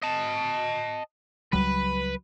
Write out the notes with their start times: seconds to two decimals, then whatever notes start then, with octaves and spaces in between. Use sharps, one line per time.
0.03 D#5 A5
1.53 C#2 F#3 G3 B4